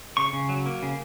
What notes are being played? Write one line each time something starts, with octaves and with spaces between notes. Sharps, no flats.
C#3 C#6
C#3
F#3
A#3
C#3